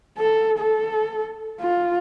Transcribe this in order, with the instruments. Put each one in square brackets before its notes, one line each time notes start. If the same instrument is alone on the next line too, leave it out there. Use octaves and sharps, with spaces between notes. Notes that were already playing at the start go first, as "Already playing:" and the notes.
[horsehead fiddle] A4
A4
F4